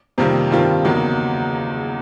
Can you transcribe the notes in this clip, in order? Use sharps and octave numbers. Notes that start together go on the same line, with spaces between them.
F2 C3 D#3 G3 A#3
G2 D#3 G3 C4 F4
E2 C#3 F#3 A#3 D#4